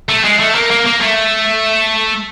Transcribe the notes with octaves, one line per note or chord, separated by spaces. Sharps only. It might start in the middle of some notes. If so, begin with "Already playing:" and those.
A3
G#3
A3
A#3
A#3
A#3
A3